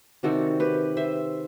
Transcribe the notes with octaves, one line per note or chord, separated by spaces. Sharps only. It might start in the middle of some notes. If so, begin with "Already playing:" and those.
C3 D#3 G3 C4 F#4 A4
G4 B4
C5 E5